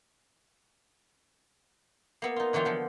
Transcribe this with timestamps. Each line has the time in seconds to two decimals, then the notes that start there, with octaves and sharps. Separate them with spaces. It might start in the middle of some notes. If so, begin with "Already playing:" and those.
2.22 A#3 B3 E5
2.36 D#4 F4
2.53 D3 E3 F#3 F4 G4
2.65 D3 F3 B3